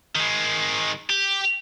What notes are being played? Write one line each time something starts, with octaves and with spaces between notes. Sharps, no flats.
D#3 G#3
G4